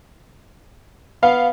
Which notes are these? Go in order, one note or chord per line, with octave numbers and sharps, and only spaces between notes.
B3 F5